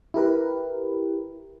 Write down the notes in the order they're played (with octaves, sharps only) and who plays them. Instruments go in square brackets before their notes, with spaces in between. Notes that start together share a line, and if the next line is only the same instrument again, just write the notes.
[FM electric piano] E4 G4 A#4 B4